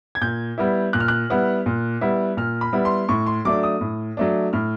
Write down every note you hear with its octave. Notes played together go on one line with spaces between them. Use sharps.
G#6
A#2 G6
G3 B3 E4
A#2 F#6
F6
F#6
G3 B3 E4
A#2
G3 B3 E4
A#2 F6
B5
G3 B3 E4
C6
A2 C#6
C6
F#3 A3 D4 D6
D#6
A2
F#3 A3 D4
A2 F6